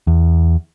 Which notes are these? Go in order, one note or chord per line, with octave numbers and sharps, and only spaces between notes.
E2